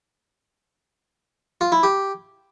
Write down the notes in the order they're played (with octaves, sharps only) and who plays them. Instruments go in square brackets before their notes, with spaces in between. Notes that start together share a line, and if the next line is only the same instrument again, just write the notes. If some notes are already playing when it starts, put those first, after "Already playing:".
[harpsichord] F4
E4
G4